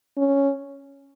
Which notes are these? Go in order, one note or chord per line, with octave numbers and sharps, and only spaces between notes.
C#4